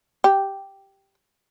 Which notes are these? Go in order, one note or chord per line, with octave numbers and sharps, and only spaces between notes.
G4